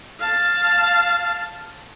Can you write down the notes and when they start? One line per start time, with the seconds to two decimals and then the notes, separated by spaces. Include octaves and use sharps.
0.20 F5 A5